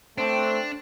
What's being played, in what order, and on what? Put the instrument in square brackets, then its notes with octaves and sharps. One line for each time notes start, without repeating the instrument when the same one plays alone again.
[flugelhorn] A3 [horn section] C4 [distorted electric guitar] D4